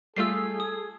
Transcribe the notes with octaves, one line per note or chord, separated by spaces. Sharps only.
G3 A3 F4 G#4 A4 E6 C7
D#6